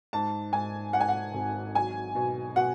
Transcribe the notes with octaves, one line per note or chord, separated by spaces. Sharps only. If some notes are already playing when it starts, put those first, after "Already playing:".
G#2 A5
G#2 G#5
G#2 F#5
G#5
F#5
G#1
F#3 G#5
B2
B2 F#5